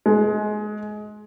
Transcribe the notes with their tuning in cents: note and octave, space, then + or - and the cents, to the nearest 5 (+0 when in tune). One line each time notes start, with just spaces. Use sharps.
G#3 +25